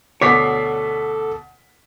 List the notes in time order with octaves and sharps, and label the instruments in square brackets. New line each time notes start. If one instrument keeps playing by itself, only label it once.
[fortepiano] D2 B2 [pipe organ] A4 [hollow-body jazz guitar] C#5 [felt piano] D6 B6 C7